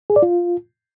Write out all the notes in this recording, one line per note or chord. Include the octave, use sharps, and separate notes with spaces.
G#4
D5
F4